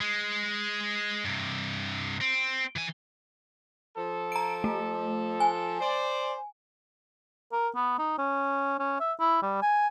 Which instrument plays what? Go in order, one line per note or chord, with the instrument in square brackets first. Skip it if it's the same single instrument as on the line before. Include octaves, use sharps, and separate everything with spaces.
[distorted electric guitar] G#3
G2 C3
C4
E3 G#5
[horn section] F3 A4
[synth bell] A#5 D7
A3
G#5
[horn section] C5 D5
[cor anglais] A#4
B3
D#4
C#4
C#4
E5
E4
G3
G#5